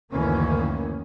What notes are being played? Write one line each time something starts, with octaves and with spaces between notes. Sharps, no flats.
F#1 D2 D#3 E3 A#3 C#4